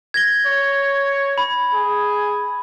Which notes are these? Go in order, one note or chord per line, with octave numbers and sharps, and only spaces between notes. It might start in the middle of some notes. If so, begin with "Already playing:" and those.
G#6 A#6 G7
C#5
B5
G#4